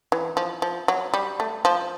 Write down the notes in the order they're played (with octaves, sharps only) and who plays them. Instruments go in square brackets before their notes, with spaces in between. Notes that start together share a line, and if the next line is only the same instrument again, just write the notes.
[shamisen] E3
F3
F3
F#3
G3
A3
F3